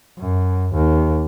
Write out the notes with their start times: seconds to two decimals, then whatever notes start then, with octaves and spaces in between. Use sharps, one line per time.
0.19 F#2
0.74 D#2